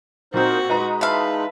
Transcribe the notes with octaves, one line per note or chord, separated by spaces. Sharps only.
A#2 C4 D#4 F#4 A#4 C5
G#3 D#4 B4 D#5 A#5
E3 B4 E5 F5 A5